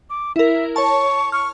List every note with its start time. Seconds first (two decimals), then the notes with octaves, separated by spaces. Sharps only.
0.10 D6
0.36 E4 A#4 E5
0.76 C#5 A5 C#6
1.32 C#6 F6